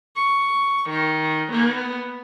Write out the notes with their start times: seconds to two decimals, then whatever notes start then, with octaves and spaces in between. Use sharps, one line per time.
0.18 C#6
0.89 D#3
1.52 B3